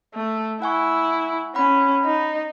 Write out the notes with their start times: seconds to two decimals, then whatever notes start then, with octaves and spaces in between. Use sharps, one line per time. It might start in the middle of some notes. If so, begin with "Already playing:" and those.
0.14 A3
0.62 E4 F#5 G#5 C#6
1.55 C#4 F#5 B5
2.05 D#4